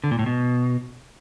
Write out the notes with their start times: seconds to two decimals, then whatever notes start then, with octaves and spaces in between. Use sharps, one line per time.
0.04 D3
0.11 A#2
0.19 A2
0.26 B2